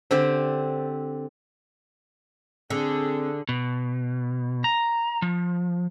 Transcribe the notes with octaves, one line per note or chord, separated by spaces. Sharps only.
D3 C4 G4 C5
D3 C4 D4 G#4
B2
A#5
F3